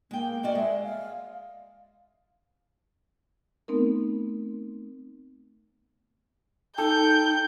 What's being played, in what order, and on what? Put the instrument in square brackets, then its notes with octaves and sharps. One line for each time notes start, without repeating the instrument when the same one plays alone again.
[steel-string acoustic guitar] G#3 G5 [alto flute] A#3
[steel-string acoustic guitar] A#3 F#4 D5 [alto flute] D#5
[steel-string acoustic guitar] G#3 [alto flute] E5
[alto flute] F5
[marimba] A3 B3 C4 D#4 A#4
[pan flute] D#4 [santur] A4 [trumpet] G5 [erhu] G6